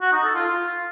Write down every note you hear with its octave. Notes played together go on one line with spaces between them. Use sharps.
F#4
D#4
A4
F4
F4